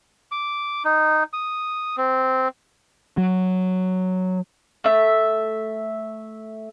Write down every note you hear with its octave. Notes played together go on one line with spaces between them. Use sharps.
D6
D#4
D#6
C4
F#3
A3 E5